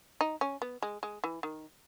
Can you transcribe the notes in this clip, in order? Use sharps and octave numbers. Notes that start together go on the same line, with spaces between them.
D#4
C#4
B3
G#3
G#3
E3
D#3